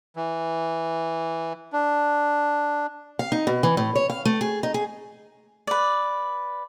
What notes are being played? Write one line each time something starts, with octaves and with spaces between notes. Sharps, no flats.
E3
D4
F5
D#4
B2
E3
A2
C#5
F5
A3
G#4
D#4
G#4
B4 D5